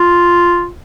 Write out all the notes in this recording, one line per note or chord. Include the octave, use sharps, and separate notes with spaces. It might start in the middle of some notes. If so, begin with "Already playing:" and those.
Already playing: F4